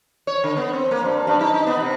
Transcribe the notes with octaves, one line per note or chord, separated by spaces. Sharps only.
C#5
D3
B3
C4
A#3
G2
G2
D#4
D#4
B3
C3